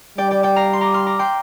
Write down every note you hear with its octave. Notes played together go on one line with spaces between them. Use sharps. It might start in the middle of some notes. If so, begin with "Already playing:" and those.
G3 D5 G5
D5 G5
D5 G5
F5 A#5
C6
A#5 D6
C6 F6
A#5 D6
G5 C6